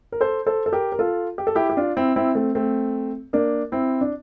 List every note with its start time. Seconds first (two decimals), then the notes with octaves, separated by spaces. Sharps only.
0.12 A#4
0.21 A4 C5
0.46 A4 C5
0.66 A4
0.72 G4 A#4
0.92 A#4
0.99 F4 A4
1.38 G4
1.47 A4
1.55 E4 G4
1.70 G4
1.77 D4 F4
1.97 C4 E4
2.16 C4 E4
2.35 A3 C4
2.55 A3 C4
3.33 A#3 D4
3.72 C4 E4
4.01 D4